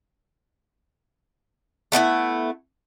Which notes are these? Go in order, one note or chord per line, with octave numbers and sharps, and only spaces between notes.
A3 B3 D#4 E4